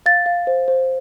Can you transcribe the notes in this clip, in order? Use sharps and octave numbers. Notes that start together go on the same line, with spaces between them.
F5 A6
F5
C5
C5